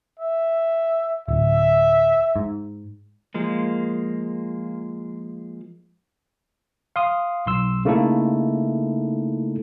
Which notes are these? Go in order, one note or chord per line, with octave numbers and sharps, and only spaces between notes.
E5
D1 E5
G#2
F3 G#3 A#3
F5 C6 D#6
B1 C6 E6
C#3 A3 A#3 D#4 E4 A4